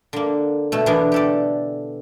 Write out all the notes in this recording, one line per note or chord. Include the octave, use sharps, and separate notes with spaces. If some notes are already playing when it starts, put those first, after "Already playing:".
D3 A#3
B2 A3
B2 D3 E3 B3 D4 A#4
G4 A4 D5